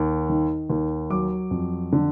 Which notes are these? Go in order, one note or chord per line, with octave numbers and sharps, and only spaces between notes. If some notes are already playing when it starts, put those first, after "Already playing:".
Already playing: D#2
D#3
D#2
F#3 D6
F2
D3